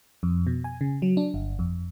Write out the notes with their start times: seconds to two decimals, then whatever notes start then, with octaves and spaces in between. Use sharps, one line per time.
0.23 F2
0.47 B2
0.64 G#5
0.81 C#3
1.02 F#3
1.17 D4
1.34 G1
1.59 F2